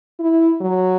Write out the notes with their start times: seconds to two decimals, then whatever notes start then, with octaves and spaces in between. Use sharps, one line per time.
0.20 E4
0.62 F#3